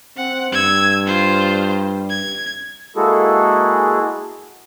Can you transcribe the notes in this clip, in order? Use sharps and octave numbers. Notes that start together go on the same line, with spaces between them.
C4 F#5
G2 E6 G#6
F4 C5
G#6
G#3 A#3 E4 F#4 G#4 A4